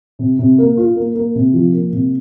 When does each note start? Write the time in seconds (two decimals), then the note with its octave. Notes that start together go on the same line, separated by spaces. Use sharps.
0.19 C3
0.39 C3
0.58 A#3
0.77 F4
0.96 A#3
1.15 A#3
1.35 C3
1.54 F3
1.73 A#3
1.93 C3